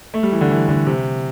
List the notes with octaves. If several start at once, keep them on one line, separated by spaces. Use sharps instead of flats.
A3
G3
E3
D3
E3
D3
C3